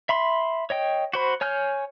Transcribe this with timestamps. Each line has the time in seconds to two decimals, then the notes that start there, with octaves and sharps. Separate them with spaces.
0.09 E5 B5 C6
0.70 C#5 D#5 G5
1.13 F#4 C5 B5
1.41 C#5 G#5 F6 G6